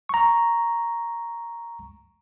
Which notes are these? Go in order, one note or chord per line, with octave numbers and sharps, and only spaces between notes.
A#5 C#6